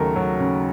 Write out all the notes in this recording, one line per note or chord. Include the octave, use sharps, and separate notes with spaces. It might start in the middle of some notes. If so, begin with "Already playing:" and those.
Already playing: D#2 C#3 F#3 A3 A4 A#4
F#3
C#3